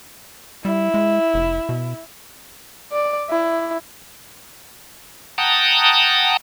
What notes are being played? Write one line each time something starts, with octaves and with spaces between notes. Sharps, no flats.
G3 E4
G#3
F1
B2
D5
E4
F#5 G5 A5 A#5 D#6